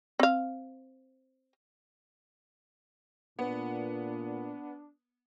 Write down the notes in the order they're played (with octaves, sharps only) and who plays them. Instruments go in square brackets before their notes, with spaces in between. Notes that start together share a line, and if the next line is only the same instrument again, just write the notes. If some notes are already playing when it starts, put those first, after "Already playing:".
[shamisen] C4 F5
[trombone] A#2 [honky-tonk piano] B3 [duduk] D4